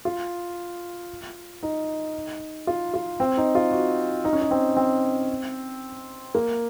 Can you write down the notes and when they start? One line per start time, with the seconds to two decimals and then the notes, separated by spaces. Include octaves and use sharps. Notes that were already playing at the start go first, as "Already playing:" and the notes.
0.05 F4
1.63 D#4
2.67 F4
2.94 F4
3.20 C4
3.37 D#4
3.55 F4
3.72 F#4
4.25 D#4
4.33 C#4
4.41 D#4
4.51 C4
4.77 C4
6.35 A#3